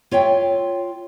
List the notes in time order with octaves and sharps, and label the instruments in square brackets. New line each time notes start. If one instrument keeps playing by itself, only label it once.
[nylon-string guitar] F4 C#5 E5 G5